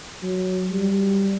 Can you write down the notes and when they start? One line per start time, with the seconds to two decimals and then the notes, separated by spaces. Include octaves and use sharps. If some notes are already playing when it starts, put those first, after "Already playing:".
0.23 F#3
0.70 G3